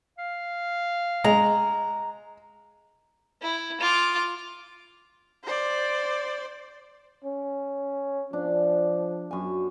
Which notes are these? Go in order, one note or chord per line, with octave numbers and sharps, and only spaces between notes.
F5
G#3 A#5
E4
F4 D6
C5 D5
C#4
F3 D4
F#2 G#5